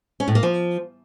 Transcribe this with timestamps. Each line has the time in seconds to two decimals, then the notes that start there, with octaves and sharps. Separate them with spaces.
0.20 C#4
0.28 A2
0.35 A#3
0.43 F3